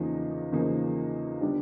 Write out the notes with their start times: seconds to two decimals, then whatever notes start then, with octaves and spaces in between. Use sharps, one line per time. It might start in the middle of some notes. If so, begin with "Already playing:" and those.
Already playing: E2 C#3 F3 A#3 D#4
0.52 E2 C#3 F3 A#3 D#4
1.41 D3 G3 B3 D4